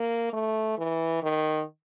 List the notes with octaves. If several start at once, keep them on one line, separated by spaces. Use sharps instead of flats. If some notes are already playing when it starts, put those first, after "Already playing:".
Already playing: A#3
A3
E3
D#3